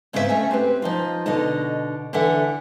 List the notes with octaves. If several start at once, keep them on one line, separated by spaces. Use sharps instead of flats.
G#2 C#3 B3 C4 G4 E5
A3 C#4 G#5
C4 G4 B4
F3 D#4 F4
B2 D3 D#4 D#5 A5
D3 E3 A4 E5 F#5